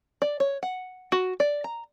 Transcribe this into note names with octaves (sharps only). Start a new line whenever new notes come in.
D5
C#5
F#5
F#4
D5
A#5